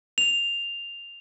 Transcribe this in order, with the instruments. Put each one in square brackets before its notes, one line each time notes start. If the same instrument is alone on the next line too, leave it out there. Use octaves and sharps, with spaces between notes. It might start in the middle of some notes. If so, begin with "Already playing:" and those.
[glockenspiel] F7